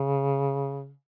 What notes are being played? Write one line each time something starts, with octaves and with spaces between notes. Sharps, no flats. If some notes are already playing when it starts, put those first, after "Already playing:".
Already playing: C#3